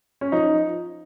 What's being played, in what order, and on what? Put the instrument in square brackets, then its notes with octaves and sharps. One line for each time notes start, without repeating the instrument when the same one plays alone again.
[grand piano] C#4
F3 D#4